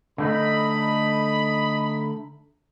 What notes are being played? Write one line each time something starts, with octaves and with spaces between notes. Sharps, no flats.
D3 A3 D#4 D#5 B5